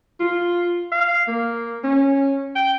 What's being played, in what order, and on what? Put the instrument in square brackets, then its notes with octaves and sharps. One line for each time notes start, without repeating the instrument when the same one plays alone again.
[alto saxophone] F4
F5
A#3
C#4
G5